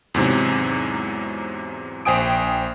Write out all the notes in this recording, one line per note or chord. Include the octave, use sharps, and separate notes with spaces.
E2 G#2 C3 F#3
A#1 C5 G5 G#5 D#6 D7